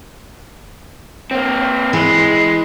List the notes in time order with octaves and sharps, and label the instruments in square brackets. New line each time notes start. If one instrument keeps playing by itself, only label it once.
[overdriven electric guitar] A#3 C4
[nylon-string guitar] E3 [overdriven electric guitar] G#3